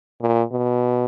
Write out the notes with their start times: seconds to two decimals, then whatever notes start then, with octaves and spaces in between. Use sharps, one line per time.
0.21 A#2
0.52 B2